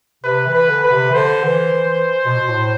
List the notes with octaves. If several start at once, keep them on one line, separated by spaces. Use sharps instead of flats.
C3 B4
E3
B4
D3
B4
C3
E3
D3 C5
E3
E3
B2
B2
A2